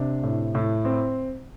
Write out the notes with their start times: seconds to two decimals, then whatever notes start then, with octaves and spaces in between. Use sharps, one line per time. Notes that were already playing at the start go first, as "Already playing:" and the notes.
Already playing: C3 D4
0.23 A2
0.55 A2
0.85 C4